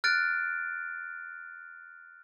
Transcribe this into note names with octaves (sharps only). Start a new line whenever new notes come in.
F6 F#6 A6 D7